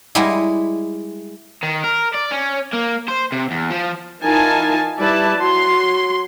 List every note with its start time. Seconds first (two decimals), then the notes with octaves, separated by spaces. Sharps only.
0.15 G3 G#3 E4 G4 G#4
1.63 D#3
1.84 A#4
2.15 D5
2.32 C#4
2.73 A#3
3.08 C5
3.32 C3
3.51 E2
3.70 F3
4.21 E3 D#4 F4 A#4 G#5 A5
4.99 G3 E4 B4 D5 A5
5.38 F#3 C6